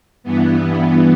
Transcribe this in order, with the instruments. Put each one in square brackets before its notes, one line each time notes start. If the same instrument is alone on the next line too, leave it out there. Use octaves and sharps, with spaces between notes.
[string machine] G2 E3 B3